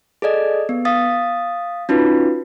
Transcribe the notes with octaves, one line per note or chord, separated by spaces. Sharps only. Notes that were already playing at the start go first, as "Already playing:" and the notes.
G#4 A4 D5 D#5
B3
F5 D#6 A6
C#4 D#4 F4 F#4 B4